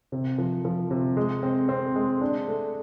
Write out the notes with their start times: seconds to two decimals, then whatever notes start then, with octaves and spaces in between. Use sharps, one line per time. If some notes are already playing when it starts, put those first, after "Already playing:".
0.12 C3
0.38 F3
0.65 F3
0.91 C3
1.17 G#3
1.43 C4
1.69 C4
1.95 G#3
2.21 D4
2.48 A3